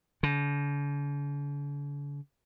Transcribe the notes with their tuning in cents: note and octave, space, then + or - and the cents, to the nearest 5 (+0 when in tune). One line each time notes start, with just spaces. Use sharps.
D3 -45